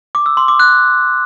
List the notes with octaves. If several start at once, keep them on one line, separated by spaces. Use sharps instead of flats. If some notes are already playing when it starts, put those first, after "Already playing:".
D6
E6
C6
D6
F#6